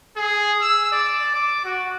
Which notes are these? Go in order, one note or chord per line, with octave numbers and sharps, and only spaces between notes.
G#4
E6
D5
D6
F#4